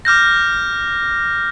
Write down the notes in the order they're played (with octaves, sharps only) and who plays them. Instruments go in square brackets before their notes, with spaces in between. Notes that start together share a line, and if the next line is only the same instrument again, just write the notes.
[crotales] D6 F6 G6 A#6